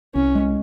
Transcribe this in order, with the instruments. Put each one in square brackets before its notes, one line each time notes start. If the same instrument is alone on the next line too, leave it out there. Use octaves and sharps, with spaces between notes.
[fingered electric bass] C2 [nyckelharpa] C#4
[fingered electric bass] G#3